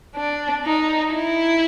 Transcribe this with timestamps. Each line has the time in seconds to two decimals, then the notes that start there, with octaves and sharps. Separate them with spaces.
0.16 D4
0.65 D#4
1.14 E4